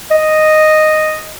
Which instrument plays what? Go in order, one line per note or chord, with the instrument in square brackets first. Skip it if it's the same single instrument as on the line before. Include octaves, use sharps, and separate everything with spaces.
[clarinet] D#5